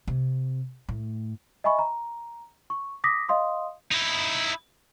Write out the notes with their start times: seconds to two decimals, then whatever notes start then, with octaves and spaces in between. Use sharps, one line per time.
0.07 C3
0.89 A2
1.64 D#5 E5 G#5 B5 C#6
1.79 A#5
2.70 C#6
3.04 D6 D#6 A#6 B6
3.29 D#5 F5 C6 D#6
3.91 D#4 E4